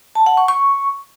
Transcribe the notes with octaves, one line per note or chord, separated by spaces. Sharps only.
A5
F#5
C#6
C#6